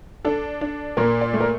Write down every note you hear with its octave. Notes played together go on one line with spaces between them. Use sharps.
D4 A4
D4
A#2 A#4
D5
A3
A#4